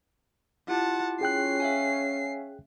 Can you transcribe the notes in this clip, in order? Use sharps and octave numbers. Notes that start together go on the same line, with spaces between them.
E4 F4 G4 F#5 A5
C#4 G#4 G5 F#6 C7
E5 F5 G#5